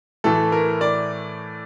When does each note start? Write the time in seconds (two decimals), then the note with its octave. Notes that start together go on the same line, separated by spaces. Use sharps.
0.24 A2 E3 A3 A4
0.52 A#4
0.81 D5